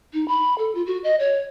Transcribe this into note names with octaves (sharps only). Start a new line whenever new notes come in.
D#4
B5
A4
F4
F#4
D#5
C#5